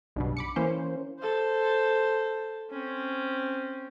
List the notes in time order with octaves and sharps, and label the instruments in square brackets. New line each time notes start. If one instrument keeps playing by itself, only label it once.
[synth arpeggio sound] B1 G2 B2
B5 D6 C#7
E3 A#3 C#4 C5
[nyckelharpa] A4 C5
C4 C#4